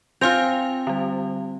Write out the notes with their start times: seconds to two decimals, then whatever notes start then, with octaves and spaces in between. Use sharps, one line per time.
0.21 C4 F4 F5 G#5 F7
0.87 D3 G3